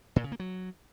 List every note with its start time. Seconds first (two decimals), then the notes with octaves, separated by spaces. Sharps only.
0.16 A#2
0.24 C#3
0.32 A#3
0.40 F#3